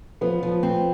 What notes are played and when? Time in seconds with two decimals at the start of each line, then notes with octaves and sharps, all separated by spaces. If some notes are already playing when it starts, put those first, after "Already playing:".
0.21 F3 B3
0.43 F3
0.63 C4